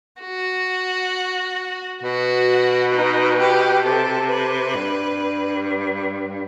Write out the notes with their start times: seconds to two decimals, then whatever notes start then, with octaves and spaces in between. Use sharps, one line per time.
0.21 F#4
2.03 B2 F#4
2.94 D#4
3.39 G4
3.85 C3 A4
4.30 B4
4.75 G2